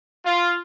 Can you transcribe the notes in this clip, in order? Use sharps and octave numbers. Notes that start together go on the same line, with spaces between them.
F4